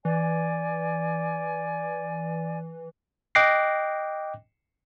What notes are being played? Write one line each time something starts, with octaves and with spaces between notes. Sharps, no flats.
E3 D5 G#5
D#5 G5 D6 F#6 A#6 C7